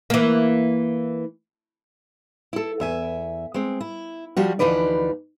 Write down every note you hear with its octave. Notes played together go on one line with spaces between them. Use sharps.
E3 A#3
E4 A4
E2 E5 G#5
G#3 C4
E4
F3 G3 F#4
D2 E3 F3 D#4 B4 D5